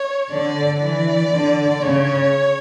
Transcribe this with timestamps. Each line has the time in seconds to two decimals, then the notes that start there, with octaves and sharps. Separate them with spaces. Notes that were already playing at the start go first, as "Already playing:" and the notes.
Already playing: C#5
0.31 D3 D5
0.81 E3 D5
1.32 D3
1.82 C#3 C#5